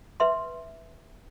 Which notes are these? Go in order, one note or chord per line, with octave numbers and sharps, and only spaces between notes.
B4 E5 C6